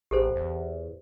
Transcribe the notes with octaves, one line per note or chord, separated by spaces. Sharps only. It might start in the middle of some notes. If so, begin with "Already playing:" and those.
A1 G4 A4 C5
E2